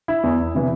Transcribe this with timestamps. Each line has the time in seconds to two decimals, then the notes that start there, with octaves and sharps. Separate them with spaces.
0.08 E4
0.23 E2
0.54 C3 E3